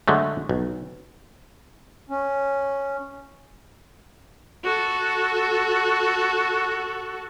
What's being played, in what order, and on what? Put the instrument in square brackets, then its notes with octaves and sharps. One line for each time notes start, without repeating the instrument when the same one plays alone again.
[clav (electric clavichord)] D3 F#3 G#3 A3
B1
[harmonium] C#4
[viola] F#4 A4